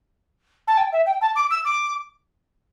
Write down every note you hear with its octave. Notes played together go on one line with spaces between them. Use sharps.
A5
G5
E5
G5
A5
D6
E6
D6